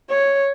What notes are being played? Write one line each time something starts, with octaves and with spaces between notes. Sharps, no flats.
C#5